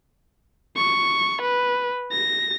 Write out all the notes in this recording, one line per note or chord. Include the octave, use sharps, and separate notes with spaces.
C#6
B4
A#6